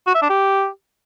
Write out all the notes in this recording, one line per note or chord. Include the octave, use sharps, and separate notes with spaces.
F#4
E5
D4
G4